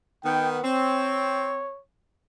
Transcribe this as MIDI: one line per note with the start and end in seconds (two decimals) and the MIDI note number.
0.24 0.59 51
0.24 0.59 59
0.24 0.49 79
0.64 1.69 60
0.64 1.80 73